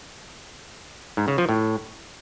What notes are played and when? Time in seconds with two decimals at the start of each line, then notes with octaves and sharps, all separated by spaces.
1.17 G#2
1.28 C#3
1.38 F3
1.49 A2